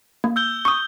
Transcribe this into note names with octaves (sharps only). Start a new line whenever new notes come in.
A#3
E6 G6 G7
C#6 D#6